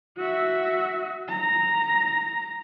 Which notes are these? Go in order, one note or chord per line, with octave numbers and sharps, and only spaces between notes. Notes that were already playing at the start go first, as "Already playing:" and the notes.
F#4 E5
A#5